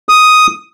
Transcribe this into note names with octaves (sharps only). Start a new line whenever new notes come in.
D#6